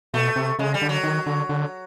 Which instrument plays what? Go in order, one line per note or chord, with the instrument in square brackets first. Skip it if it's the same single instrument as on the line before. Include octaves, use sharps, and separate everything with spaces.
[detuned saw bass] B2 [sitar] A3
[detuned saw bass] C3
[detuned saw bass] C#3 [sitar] G#3
[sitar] G3
[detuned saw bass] D3
[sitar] F#3
[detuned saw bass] D#3
D3
D3